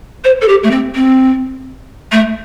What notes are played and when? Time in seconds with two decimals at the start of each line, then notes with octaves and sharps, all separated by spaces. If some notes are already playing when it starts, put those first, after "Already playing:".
0.24 C5
0.41 A4
0.48 G4
0.64 A3
0.71 C4
0.95 C4
2.12 A3